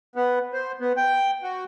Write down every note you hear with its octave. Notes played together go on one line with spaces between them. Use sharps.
B3
C5
B3
G5
F#4